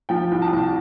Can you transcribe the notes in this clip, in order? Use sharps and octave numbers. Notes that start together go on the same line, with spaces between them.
F3 G5
C2
A5
C2